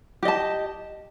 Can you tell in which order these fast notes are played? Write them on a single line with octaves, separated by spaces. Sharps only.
G4 D#5 A5